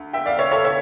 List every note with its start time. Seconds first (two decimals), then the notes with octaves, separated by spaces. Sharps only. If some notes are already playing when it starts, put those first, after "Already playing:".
Already playing: D2
0.13 E5 G5
0.26 D5 F5
0.39 C#5 E5
0.52 A4 C#5
0.65 C#5 E5